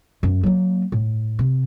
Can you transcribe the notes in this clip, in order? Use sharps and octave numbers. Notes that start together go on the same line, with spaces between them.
F#2
F#3 A#3
A2
C3